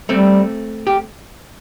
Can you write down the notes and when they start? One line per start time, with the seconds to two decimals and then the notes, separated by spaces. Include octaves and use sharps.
0.09 G3 A3 C4
0.87 G4